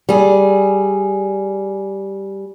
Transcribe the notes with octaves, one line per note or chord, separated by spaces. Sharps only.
G3 G#4